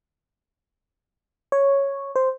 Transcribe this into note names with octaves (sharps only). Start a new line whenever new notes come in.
C#5
C5